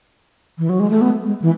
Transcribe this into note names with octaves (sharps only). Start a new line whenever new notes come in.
E3
F#3
G#3
A3
B3
G#3
E3